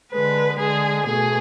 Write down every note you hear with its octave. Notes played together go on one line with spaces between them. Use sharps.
D3 G#3 B4
D3 G#3 G#4
B2 A3 G#4